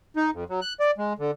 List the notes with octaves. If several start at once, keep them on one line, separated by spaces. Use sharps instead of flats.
D#4
F2
F#3
F#6
D5
G#3
D3